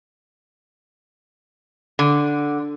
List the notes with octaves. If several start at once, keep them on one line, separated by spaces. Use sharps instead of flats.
D3